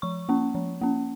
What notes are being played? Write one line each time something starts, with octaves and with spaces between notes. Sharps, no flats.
F3 C#6
A#3 C#4
F3
A#3 C#4